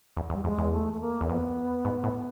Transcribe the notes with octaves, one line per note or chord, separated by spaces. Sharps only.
E2
E2
G3
F2 G#3
E2
A3
A3
A#3
E2
C4
F2 B3
G#2
A2